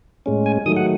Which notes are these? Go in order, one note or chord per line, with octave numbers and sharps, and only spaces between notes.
A2 G#3 C#4
G#5
D#3 F#3 A3 D#6
F#5